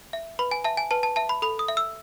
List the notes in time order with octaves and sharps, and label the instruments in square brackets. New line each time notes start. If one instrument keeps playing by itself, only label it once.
[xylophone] E5
B4 B5
G#5
E5 A5
G#5
B4 A5
A5
E5 A5
B5
A4 B5
D#6
E5
E6